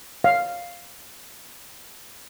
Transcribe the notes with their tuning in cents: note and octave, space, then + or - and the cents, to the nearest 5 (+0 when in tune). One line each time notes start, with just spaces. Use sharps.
C#5 +15 F5 +0